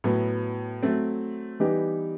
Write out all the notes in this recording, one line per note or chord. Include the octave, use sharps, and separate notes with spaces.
A2 F#3 B3
F#3 A3 C4
E3 G3 B3 D#4 G4